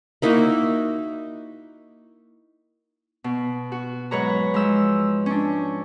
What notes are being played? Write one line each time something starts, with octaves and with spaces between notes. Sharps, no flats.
A#3 D#4 E4 F#4
B2
F#4
G#2 F#3 B4 C#5 A#5
F3 G#3 E6
C#4 D4